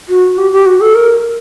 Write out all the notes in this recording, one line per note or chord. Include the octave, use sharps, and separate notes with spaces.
F#4
G4
G4
F#4
A4
A#4